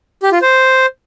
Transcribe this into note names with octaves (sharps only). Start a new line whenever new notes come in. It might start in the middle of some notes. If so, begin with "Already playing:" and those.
G4
F4
C5